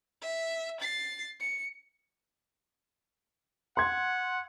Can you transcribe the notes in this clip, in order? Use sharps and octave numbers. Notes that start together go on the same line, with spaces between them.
E5
A6 C7
C#7
F#5 C6 G#6